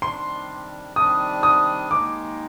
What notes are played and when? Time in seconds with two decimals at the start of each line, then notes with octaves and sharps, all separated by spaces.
0.02 C3 D#3 G3 D4 C6
0.96 C3 D#3 G3 D4 D#6
1.43 D#6
1.91 D#2 D#3 G#3 D#4 D6